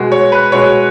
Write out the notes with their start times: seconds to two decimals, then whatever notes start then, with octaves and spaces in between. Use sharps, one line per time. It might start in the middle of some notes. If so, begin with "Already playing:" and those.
Already playing: B2 G#3
0.12 C#5
0.32 B4
0.52 B2 G#3 C#5